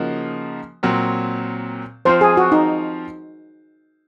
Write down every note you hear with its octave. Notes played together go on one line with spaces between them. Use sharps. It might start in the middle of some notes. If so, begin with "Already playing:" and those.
Already playing: C#3 F3 A#3 D#4 F#4
A#2 F#3 C4
F3 C4 F4 C5
G#4
F#4
D#4